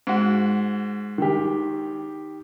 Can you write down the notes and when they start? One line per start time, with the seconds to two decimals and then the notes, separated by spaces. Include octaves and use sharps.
0.07 G#2 F#4
1.18 D#3 G4